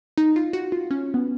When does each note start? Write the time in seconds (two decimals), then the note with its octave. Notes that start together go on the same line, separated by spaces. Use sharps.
0.18 D#4
0.36 F4
0.53 F#4
0.72 F4
0.91 C#4
1.14 B3